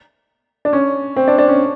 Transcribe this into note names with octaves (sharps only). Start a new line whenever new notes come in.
D4
C#4
C4
D4
D4
C#4